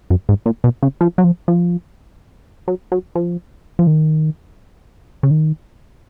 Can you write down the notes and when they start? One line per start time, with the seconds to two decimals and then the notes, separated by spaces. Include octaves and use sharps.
0.10 F#2
0.29 G#2
0.46 A#2
0.64 B2
0.83 C#3
1.01 F3
1.18 F#3
1.24 F3
1.48 F3
2.68 F#3
2.92 F#3
3.15 F3
3.79 F3
3.87 D#3
5.23 C#3
5.31 D#3